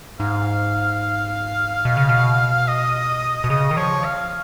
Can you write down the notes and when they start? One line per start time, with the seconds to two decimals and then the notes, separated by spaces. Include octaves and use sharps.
0.20 G#2 F5
1.85 B2
1.97 C#3
2.09 B2
2.68 D#5
3.44 B2
3.50 C#3 D#5
3.71 D#3
3.77 F3 C#5
4.04 F5